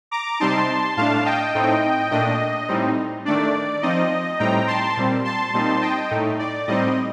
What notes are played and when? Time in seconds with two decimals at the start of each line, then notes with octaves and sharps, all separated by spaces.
0.11 A#5 D6
0.40 C3 G3 C4 D#4 A5 C6
0.97 A2 A3 D4 F5 A5
1.25 D#5 G5
1.55 A2 A3 C4 D#4
2.11 A#2 A3 D4 D#5
2.68 A2 G3 C4 D#4
3.25 D#3 A3 D4 D5
3.82 F3 C4 D#4 D#5
4.39 A2 G3 C4 D#4 G5 A#5
4.67 A5 C6
4.97 A#2 G3 C4
5.25 A5 C6
5.54 A#2 G3 C4 D#4
5.81 D#5 G5
6.10 A2 A3 D#4
6.39 D5
6.67 A2 G3 C4 D#4 D#5